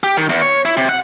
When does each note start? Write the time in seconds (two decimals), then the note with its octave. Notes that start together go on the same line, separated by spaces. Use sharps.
0.03 G4
0.17 D#3
0.29 E2
0.42 C#5
0.65 E4
0.77 C3
0.89 F#5